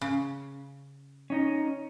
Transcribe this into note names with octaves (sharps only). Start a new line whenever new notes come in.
C#3
C#4 D#4